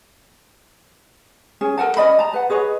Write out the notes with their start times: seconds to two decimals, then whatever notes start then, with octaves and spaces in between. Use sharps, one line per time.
1.61 C#4 G#4
1.77 A4 A#4 F#5 A5
1.97 C#4 D5 D#5 B5
2.19 A5 A#5
2.34 B4 F#5
2.50 G#4 B4 C#5 D#5